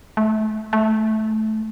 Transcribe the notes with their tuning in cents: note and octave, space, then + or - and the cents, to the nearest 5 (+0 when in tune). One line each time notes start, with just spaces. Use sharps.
A3 -25
A3 -15